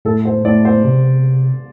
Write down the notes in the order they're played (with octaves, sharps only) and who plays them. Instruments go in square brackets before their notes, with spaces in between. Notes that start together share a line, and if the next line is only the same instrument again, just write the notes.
[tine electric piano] A2 [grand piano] A4
[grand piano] C5
[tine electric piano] A2 [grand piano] D5
[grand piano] C5
[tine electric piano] C3